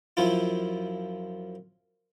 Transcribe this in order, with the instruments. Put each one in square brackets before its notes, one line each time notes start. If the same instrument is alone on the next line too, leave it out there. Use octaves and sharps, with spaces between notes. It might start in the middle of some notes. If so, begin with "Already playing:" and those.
[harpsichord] F#2 F3 E4 F4